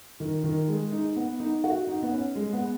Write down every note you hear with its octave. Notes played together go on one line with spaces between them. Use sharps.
D#3
D#3
G#3
D#4
B3
D#4
F#4
D#4
B3
C#4
G#3
B3